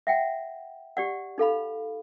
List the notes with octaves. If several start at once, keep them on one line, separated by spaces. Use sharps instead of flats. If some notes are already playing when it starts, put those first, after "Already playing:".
E5 F#5 G5
G4 D5 F#5
D#4 A4 F5 B5